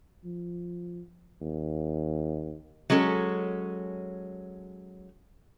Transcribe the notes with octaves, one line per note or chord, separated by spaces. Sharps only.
F3
D#2
F#3 G#3 C#4 A4